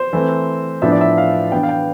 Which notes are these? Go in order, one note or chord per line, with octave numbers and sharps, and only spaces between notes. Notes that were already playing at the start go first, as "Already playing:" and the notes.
Already playing: C5
E3 A3 C4
A2 F3 B3 D4 E5
D5
E5
F5
E3 B3 D4 G5
F5
G5